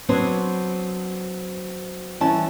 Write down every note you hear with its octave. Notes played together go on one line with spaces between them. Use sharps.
F#3 B3 C4 D4 C5 C#5
E3 G3 C#4 A5